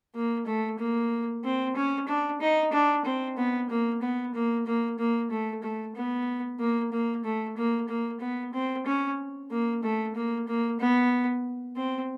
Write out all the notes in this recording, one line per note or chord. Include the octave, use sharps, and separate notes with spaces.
A#3
A3
A#3
C4
C#4
D4
D#4
D4
C4
B3
A#3
B3
A#3
A#3
A#3
A3
A3
B3
A#3
A#3
A3
A#3
A#3
B3
C4
C#4
A#3
A3
A#3
A#3
B3
C4